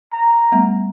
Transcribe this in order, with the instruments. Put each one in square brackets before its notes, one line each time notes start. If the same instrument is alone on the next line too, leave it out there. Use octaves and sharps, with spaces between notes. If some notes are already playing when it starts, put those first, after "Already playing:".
[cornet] A#5
[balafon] G3 A3 B3